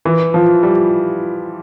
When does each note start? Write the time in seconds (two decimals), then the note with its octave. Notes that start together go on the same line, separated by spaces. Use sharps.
0.05 E3
0.34 F3
0.63 G3